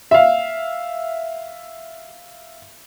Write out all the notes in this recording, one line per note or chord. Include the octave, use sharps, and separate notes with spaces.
E5 F5